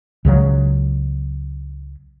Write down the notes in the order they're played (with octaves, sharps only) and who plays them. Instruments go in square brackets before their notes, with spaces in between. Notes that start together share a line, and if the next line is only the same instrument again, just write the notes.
[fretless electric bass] C#2 C#3 F3 F#3